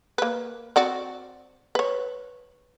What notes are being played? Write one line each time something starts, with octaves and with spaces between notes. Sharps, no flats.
A#3 B4
C4 F#4 D5
B4 C#5